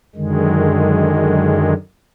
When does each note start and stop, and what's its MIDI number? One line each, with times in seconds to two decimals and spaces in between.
0.16 1.74 42
0.16 1.74 50
0.16 1.74 51
0.16 1.74 56